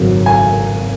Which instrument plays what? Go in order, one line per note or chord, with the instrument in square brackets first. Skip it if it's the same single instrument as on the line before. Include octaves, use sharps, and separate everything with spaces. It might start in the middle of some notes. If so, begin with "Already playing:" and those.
Already playing: [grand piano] G#1 F#2 C#3 F#3
G#5